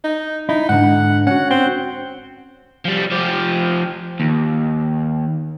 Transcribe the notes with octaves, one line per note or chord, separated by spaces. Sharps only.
D#4
D#4 E4
G#2 D3 F#5
C#4 F#4 F#5
C4
F3 G3
F3 G4
D#2